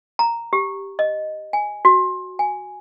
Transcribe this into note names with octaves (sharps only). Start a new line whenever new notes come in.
A#5
G4
D#5
G#5
F#4
G#5